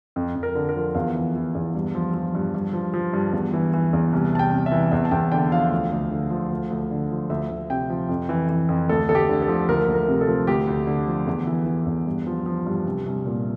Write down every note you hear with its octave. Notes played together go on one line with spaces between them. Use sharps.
F2
F2
A#4
D3
A#4
F3
E2 F5
E3
E3
E2
G2
F3
F3
G2
G2
F3
F3
G2
E2
E3
E3
E2
C2
C2 A5
G5
C3
E5
E3
E2 E5
A5
E2 G5
D3 G5
F3 F5
D2
D2
D3
F3
D2
D2
D3
F3
D2 E5
D2
C3 G5
F3
F2
E3
E3
F2
D2 A4
D2 A4
G4
D3
A4
F3
D2 A#4
D2
A#4
C3
A4
F3
D2 G4
D2
D3
F3
E2
E3
E3
E2
G2
F3
F3
G2
C2
C2
A#2